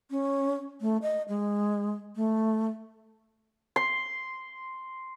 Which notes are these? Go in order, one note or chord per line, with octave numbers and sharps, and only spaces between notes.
C#4
A3
D#5
G#3
A3
C6